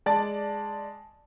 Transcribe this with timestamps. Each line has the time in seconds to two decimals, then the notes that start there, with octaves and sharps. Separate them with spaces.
0.06 G#3 D5 A5 A6